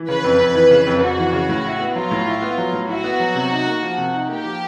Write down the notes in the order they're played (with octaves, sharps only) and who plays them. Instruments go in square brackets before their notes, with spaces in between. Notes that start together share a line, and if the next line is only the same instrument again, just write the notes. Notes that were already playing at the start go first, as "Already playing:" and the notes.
Already playing: [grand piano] E3
[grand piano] C#3 [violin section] B4
[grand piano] F2
F2
E3
C#3
F2
[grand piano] F2 [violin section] F#4
[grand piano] E3
C#3
A2
E4
B3
[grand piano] F#3 [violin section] F4
[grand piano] A2
E4
B3
F#3
A2
[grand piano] E4 [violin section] F#4
[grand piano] B3
F#3
C3
D#4
A#3
F3
C3
D#4
[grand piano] A#3 [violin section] G4
[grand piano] F3